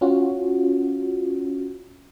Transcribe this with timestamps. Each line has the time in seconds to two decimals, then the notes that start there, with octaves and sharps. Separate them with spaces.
0.01 C#4 F4 F#4